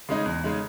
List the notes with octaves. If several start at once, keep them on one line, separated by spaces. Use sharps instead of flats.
C#3 G#3 D#4
E2
C#3 G#3 D#4